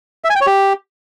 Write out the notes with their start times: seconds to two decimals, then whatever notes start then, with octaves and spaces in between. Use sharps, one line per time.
0.24 E5
0.30 G#5
0.36 G5
0.41 C#5
0.47 G4